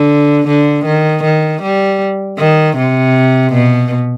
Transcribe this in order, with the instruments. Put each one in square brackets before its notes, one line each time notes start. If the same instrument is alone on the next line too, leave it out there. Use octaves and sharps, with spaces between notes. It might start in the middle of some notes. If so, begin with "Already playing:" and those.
Already playing: [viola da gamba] D3
D3
D#3
D#3
G3
D#3
C3
B2